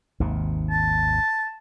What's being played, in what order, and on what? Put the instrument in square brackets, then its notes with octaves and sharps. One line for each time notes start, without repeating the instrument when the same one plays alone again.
[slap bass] G#1 D#2 C3
[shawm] A5